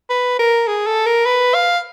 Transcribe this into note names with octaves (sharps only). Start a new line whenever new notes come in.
B4
A#4
G#4
A4
A#4
B4
F5